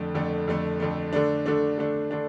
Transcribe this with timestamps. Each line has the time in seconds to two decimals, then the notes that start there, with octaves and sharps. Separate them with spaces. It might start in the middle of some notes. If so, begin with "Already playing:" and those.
Already playing: F2 D3 A3
0.14 F2 D3 A3
0.48 F2 D3 A3
0.80 F2 D3 A3
1.13 D3 A3 D4
1.46 D3 A3 D4
1.78 D3 A3 D4
2.11 D3 A3 D4